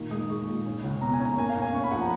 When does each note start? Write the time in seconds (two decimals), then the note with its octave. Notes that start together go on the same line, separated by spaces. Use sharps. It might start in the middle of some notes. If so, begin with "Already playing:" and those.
Already playing: A#2 D#3
0.11 G#3 D#6
0.30 G#3 C#6
0.48 A#2
0.66 C#4
0.84 C#2
1.01 B2 A#5
1.13 G#5
1.20 C#4
1.25 A#5
1.37 A#3 G#5
1.49 F5
1.56 C#4
1.62 G#5
1.73 C#4 C#6
1.84 B5
1.91 F3 F#5
2.01 A#5